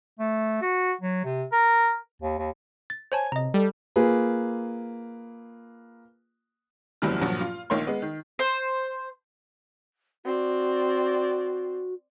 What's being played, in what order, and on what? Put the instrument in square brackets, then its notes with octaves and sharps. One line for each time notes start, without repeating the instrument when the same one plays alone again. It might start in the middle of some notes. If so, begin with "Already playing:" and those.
[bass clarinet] A3
F#4
F#3
C3
A#4
D#2
D#2
[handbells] A6
[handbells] C5 C#5 A5 [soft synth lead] G#5
[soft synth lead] C3 [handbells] D#5 A#5
[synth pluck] G3 [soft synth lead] A4
[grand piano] A#3 F4 G#4 B4
[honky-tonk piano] F#1 E2 F#3 G3 E4 F6
G2 A#2 F3 F#3 F#4
F4
A#1 D#3 A#3 C#5 C6
G#3 B3
D#3
[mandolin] C5
[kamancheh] C4 D5 [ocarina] F#4